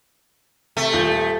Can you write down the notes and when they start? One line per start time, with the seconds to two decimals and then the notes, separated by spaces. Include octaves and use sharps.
0.77 C3 A3
0.93 D#1 F4 G6